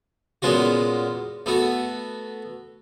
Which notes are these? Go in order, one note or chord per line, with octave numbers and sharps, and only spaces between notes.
A#2 G#3 B3 C#4 F4 F#4
A3 B3 F#4